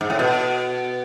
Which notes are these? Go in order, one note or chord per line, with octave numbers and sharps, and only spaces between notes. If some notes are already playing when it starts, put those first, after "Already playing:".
G#2
A2
B2